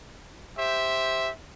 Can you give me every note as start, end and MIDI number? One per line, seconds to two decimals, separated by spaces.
0.57 1.30 67
0.57 1.30 72
0.57 1.30 76